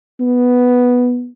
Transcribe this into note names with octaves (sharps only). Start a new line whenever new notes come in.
B3